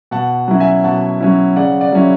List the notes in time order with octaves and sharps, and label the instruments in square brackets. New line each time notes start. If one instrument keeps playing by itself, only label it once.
[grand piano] B2 F#5 A5
F#3 C#4 E4
E5 G#5
B2 F#5 A5
F#3 C#4 E4
C#3 D5 F#5
D5 F#5
F#3 C#4 E4